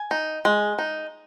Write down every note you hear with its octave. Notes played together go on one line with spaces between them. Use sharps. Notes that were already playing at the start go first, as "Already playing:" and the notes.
Already playing: G#5
D#4
G#3
D#4